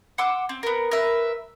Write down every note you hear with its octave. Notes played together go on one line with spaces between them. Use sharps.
F#5 C6 D6 E6
C4
B3 A#4
A#4 B4 E5